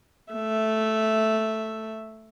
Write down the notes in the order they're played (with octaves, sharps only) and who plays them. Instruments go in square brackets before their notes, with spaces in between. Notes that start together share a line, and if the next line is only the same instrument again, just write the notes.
[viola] A3 E5